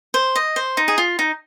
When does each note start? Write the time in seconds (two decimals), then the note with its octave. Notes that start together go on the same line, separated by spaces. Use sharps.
0.14 C5
0.35 D#5
0.56 C5
0.77 D#4
0.88 G#4
0.98 F4
1.19 D#4